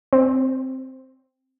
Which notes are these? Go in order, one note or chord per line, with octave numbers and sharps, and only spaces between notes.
C4